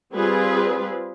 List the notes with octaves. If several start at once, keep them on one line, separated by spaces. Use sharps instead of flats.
G3 C4 F4 G#4 B4